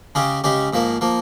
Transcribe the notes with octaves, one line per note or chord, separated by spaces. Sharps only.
C#3 G#3 C#4 G4
C#3 G#3 C#4 G4
G#2 F3 A#3
F3 A#3